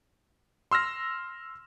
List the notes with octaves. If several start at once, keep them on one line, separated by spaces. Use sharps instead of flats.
C6 E6 F6 A#6